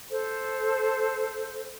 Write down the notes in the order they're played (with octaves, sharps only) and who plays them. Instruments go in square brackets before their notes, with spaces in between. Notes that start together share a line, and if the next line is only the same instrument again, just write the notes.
[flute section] A4 C5